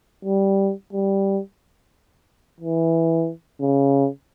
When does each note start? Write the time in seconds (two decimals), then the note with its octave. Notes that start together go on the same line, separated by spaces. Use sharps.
0.25 G3
0.93 G3
2.60 E3
3.61 C#3